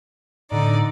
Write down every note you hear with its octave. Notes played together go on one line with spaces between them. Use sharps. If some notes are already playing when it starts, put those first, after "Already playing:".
A2 D3 D#4 D5